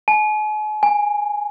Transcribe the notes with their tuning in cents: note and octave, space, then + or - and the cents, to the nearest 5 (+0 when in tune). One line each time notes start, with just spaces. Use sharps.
G#5 +45
G#5 -10